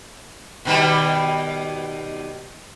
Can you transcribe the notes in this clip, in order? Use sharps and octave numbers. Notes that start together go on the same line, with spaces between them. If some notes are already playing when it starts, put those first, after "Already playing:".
B2 D#3 G3